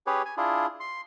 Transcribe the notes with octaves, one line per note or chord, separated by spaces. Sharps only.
C#4 G4 G#4 B4 C#5
G#5
D4 E4 F4 G#4
C6